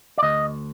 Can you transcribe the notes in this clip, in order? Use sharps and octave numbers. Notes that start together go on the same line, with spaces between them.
D5
D2 D#5